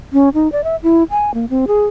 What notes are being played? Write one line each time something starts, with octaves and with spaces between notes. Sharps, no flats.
C#4
D#4
D5
E5
E4
G#5
A#3
C4
G#4